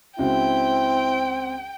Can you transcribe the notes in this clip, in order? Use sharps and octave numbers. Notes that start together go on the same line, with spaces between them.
C#2 C4 E4 F#4 G5